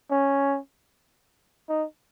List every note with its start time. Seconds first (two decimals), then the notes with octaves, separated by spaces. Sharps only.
0.11 C#4
1.69 D#4